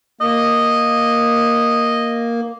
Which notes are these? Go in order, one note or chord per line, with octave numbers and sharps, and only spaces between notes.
A#3 D#5